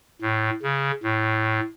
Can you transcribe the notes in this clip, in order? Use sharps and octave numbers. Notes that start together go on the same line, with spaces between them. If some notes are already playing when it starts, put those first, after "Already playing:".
A2
C#3
A2